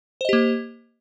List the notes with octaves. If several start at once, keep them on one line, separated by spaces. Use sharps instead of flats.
A#3 G4 C5 D#5